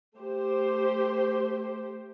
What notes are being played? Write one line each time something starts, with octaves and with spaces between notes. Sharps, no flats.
A3 G4 C5